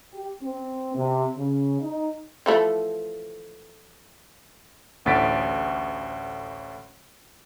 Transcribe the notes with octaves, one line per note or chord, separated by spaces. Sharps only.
G4
C4
C3
C#3
D#4
E3 F3 A3
A1 D2 A2 A6 B6 D7